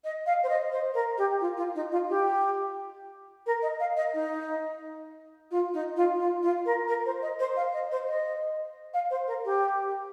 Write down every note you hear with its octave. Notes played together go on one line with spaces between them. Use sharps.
D#5
F5
C5
D#5
C5
A#4
G4
F4
F4
D#4
F4
G4
A#4
D#5
F5
D#5
D#4
F4
D#4
F4
F4
F4
A#4
A#4
C5
D#5
C5
F5
D#5
C5
D#5
F5
C5
A#4
G4